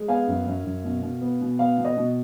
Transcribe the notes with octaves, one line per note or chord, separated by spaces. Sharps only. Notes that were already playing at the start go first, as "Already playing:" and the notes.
Already playing: G#3
B3 F5 G#5
F#2
F#2
F#2
B2
B2
B3
B2
B3 F5
B2
D#5
B2